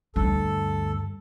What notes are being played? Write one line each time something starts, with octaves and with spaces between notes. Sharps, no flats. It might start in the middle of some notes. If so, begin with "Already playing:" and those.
D2 G2 A4